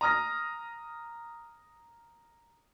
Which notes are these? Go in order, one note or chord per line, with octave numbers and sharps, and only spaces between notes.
A#5 D#6 F6 A#6